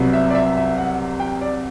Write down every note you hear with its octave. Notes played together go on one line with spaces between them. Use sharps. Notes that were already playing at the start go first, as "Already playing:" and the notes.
Already playing: C2 C3 F#3 B3
E5
D5
E5
E5
F#5
G5
D5